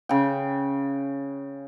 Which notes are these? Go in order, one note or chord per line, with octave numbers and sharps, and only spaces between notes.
C#3 G5